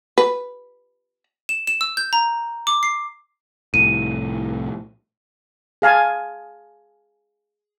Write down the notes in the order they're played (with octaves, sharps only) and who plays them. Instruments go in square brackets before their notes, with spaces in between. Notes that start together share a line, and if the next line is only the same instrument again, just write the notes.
[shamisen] B4
[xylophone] E7
E7
E6
G6
A#5
D6
C7
[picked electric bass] C2 A2 [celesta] D#7
[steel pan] G#4 F5 G#5 A5